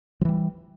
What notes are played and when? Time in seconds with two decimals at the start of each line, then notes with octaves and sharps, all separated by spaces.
0.21 F3
0.25 E3
0.29 G3